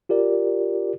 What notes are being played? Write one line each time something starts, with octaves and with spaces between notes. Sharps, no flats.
F4 G4 A#4 D5